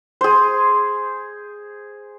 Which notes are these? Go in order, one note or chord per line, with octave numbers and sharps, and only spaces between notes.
G#4 C5